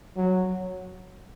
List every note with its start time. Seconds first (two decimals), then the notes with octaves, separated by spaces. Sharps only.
0.17 F#3